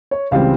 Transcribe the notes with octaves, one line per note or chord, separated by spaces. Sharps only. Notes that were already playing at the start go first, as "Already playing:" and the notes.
C#5
C#2 C#3 E3 G3 C4 F5